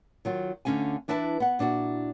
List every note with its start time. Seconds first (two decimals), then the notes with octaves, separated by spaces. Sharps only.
0.25 D#3 F#3 F4
0.65 D2 D3 E3 C#4 F5 G#5
1.08 E3 D4 E4 B4 A5
1.40 B3 F#5
1.59 A#2 D4 E4 F#4